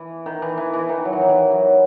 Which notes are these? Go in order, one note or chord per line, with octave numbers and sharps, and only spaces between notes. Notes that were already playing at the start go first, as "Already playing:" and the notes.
Already playing: E3
D#3
E3
E3
E3
D#3
F#3
E3
D#3
E3
F#3